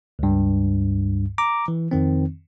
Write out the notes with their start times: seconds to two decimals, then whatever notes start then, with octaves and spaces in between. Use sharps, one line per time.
0.19 C#2 G2
1.38 A#5 D6
1.68 E3
1.91 F2 D#3 C4